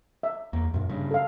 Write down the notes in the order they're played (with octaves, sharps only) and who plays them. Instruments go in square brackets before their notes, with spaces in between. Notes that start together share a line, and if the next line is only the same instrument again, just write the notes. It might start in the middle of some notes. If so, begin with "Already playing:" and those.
[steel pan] E5
[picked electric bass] E2 A#3
F#2 A#2
G2 C#3
[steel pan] A4 F5